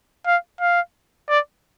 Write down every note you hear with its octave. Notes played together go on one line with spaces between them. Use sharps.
F5
F5
D5